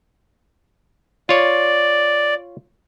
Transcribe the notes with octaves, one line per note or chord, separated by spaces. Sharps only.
F4 C#5 D5